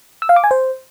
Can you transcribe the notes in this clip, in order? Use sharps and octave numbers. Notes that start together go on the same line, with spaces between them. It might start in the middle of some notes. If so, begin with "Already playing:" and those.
E6
F5
D6
G#5
C5